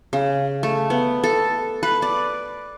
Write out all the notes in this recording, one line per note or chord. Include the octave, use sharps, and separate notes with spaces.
C#3
A3
B3
A4
B4
D5